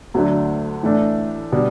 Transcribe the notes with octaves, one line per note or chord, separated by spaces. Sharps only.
D2 D3 F#3 A3 D4
A2 E3 A3 D4
B2 G3 D4